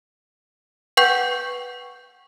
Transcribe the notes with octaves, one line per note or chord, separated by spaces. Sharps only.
B4 F#5 G5 C#6 G6 F#7